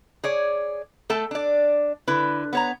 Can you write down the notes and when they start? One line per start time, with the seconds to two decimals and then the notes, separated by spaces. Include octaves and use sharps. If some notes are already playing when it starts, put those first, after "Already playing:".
0.24 G#4 C#5 D5
1.10 A3 A4 G5 A5
1.31 D4 D5
2.08 D3 E4 B4
2.53 B3 C#5 A#5